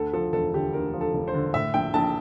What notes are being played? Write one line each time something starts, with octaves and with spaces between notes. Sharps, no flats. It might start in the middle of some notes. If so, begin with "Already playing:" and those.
Already playing: D2 A4
F3 A4
E1 A4
D3 G4
D2 A#4
F3
A4
E1
C5
D3
A2 E5
A#1 G5
A#1 A5